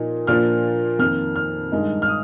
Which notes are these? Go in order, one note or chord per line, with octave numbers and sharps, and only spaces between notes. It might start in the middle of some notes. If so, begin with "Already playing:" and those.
Already playing: A#2 F3 A#3 D#4
A#2 F3 A#3 D4 F4 F6
F2 D#3 A#3 F6
F6
G2 D#3 G#3 D#4
F6
D#6